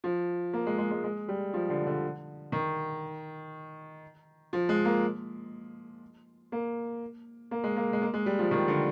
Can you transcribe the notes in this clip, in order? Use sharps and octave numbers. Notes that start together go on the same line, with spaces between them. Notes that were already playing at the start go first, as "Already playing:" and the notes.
F3
A#3
G#3
G#3
G#3
G#3
G3
F3
D3
D3
D#3
F3
G#3
A#3
A#3
A#3
G#3
A#3
G#3
A#3
G#3
G3
F3
D#3
D3